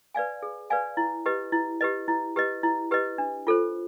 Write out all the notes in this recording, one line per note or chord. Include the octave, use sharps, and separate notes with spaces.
B4 D5 F5 G#5
G#4
B4 D5 F5 G#5
E4
G4 B4 D#5
E4
G4 B4 D#5
E4
G4 B4 D#5
E4
G4 B4 D#5
D4
F4 A4 C5